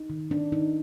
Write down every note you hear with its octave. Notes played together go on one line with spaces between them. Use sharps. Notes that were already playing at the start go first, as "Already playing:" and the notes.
Already playing: D#4
D#3
D#3 D4
D#3 D#4